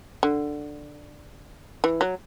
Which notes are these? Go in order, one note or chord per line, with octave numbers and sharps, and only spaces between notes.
D3
E3
F#3